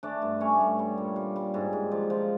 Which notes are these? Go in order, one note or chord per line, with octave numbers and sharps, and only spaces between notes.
A3 D4 D5
G2
A3 C#4 C#5
G2
G3
A#2
G3
G3
G#2
G#2
F3
F3